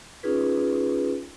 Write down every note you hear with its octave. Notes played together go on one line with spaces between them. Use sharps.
C#4 D#4 F4 G#4 B4